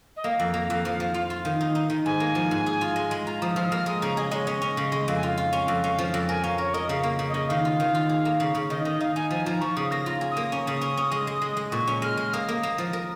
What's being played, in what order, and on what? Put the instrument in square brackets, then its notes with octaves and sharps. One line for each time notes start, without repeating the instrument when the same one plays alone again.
[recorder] D#5
[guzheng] A#3 [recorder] F5
[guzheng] F2
A#3
F2
F3
F3
F4
F4
D#3
D#4
D#4
D#3
[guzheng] G#2 [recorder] G#5
[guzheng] A#3
F3
G#2
G#4
F4
G#3
G#3
[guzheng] F4 [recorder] A#5
[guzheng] F3 [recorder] D#6
[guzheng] F3 [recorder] F6
[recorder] D#6
[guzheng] A#3 [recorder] F6
[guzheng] G#3 [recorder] D#6
[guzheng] C#3 [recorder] A#5
[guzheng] G#4 [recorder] D#5
[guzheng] G#3 [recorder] C#5
[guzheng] C#4 [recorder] D#5
[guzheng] C#4
C#3
G#3
[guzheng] F2 [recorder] F5
[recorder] G#5
[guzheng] F4 [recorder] F5
[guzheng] F4
C#4
F2
C#4
F3
F2
[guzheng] A#4 [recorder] G#5
[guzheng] C#4 [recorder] F5
[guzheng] A#4 [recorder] C#5
[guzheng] A#4 [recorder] D#5
[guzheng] C#3 [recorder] F5
[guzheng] A#3
C#3
[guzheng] C#3 [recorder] D#5
[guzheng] D#3 [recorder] F5
[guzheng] F4
D#3
F4
G#4
A#3
C#3
C#3
[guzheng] D#3 [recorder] D#5
[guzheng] D#3 [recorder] D#5
[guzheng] D#4 [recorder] F5
[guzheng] D#4 [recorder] G#5
[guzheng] F3 [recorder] G#5
[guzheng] F3 [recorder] A#5
[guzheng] F3 [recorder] C#6
[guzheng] C#3 [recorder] D#6
[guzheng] A#3 [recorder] A#6
[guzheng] F4
G#4
[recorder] D#6
[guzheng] A#3
C#4
C#3
C#4
C#4
G#3
G#3
G#3
G#3
[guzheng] A#2 [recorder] C#6
[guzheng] C#4
[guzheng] G#3 [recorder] F6
[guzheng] G#3
[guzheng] A#3 [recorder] D#6
[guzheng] A#3
A#3
F3
A#4